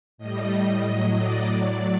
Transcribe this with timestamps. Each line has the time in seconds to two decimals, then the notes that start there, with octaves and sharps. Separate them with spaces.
0.18 A2 G3 D#5
0.83 A2 F#3
1.16 D5
1.49 A2 F#3